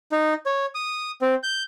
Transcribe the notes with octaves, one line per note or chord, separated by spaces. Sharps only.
D#4
C#5
D#6
C4
G6